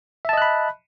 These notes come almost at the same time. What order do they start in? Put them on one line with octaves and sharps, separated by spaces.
E5 A5 D#5 F#6 B5